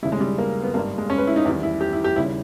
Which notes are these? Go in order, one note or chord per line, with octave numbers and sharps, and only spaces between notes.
D#2 C#3 G3 E4
G#3
G3
A#3
B3
G#1 G2 G3 A#3
G#3
C#4
B4
E4
D#4
E2 D#3 G3 E4
E4
G4
E4
G4
D#2 C#3 G3 E4